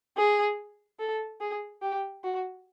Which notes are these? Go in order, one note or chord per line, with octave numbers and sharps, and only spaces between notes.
G#4
A4
G#4
G4
F#4